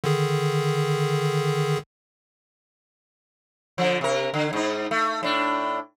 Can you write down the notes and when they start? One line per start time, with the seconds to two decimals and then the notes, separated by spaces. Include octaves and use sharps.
0.04 D3 D#3 G#4
3.78 D3 F3
4.01 C3 A#4
4.34 D3
4.53 G#2 D#4
4.91 A3
5.23 A2 D4